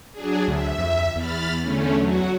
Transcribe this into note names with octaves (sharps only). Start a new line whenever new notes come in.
F#3 D4 G#4
D2 E5
F2
E2 B5 F6 A6
D3 A3 C#4
F#3 F#4